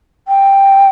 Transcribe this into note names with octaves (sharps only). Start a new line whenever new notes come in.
G5